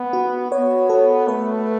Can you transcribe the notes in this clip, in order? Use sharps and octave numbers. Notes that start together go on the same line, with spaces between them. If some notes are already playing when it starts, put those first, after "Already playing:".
Already playing: B3
F#4
B3 C#5
A4
A3 B4